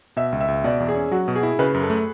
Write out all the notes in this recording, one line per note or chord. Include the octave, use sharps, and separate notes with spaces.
B2 E5
C#2
E5
C#2
B2 D5
E2
G#4
C#4
F#3 F#4
B2
G#4
E4
C#3 B4
F#2
A4
A3